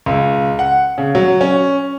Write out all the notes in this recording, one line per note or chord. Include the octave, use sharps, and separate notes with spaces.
C#2
F#5
C#3
F#3
C#4